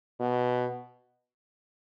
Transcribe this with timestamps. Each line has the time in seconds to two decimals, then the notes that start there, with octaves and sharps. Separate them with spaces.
0.20 B2